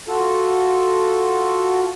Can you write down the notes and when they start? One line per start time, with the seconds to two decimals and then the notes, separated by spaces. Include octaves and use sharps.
0.08 F4 F#4 A4